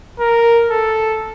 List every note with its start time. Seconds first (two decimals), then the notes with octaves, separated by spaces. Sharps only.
0.20 A#4
0.71 A4